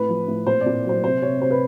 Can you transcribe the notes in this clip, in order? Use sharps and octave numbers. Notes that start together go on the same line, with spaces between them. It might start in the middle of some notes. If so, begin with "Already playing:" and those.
Already playing: A2 B4
F3
A2
A#2 C5
D5
A#2
F#3 C5
C3 C5
C3 C#5
C3 C5
B4